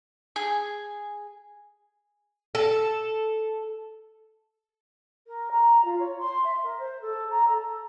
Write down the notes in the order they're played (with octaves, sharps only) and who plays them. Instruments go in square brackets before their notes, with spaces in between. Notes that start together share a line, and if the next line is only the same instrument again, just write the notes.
[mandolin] G#4
[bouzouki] A4
[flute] A#4
A#5
F4
C#5
C6
E5
A#4
C5
A4
A#5
A4